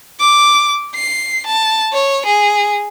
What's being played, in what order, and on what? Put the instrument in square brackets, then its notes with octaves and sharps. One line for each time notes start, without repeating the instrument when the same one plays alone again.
[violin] D6
C7
A5
C#5
G#4